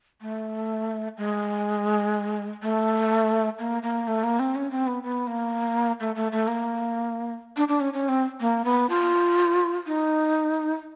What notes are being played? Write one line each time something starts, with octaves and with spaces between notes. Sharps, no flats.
A3
G#3
A3
A#3
A#3
A3
A#3
C4
C#4
C4
B3
B3
A#3
A3
A3
A3
A#3
D4
D4
C#4
C#4
C4
A#3
B3
F4
D#4